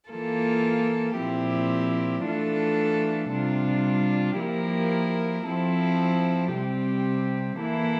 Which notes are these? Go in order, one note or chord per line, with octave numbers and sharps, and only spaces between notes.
E3 A#3 F4 A4
A#2 F3 C4 E4 G4
E3 A3 D4 F4 A4
C3 G3 D4 F4
F3 A#3 E4 G4 A#4
F3 C4 E4 A4
C3 G3 C4 G4
E3 A#3 E4 A4